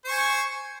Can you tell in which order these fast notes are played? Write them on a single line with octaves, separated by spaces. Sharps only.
C5 C#6 G#5